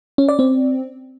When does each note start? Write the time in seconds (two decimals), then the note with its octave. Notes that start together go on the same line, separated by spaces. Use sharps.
0.18 C#4
0.29 D5
0.39 C4